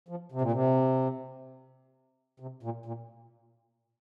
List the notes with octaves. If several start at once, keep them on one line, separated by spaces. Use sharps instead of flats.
F3
C3
A#2
C3
C3
A#2
A#2